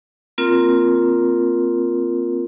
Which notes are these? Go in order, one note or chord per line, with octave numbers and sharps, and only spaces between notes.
A#3 C4 F4 A#4